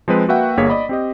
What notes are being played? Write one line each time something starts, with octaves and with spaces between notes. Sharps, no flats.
F3 G#3 C4 B4
A#3 F#4 B4 E5 F#5 G5
G1 G2 A#3 G#4 C#5 B6
D5 D#5 B5
C4 G4 D#5